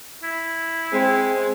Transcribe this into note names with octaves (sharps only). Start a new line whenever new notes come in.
E4
G#3 C4